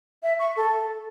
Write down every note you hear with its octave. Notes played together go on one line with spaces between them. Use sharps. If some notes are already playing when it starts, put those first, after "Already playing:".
E5
C#6
A4